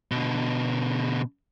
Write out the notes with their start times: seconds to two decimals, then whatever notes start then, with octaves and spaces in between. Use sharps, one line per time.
0.11 B2 D3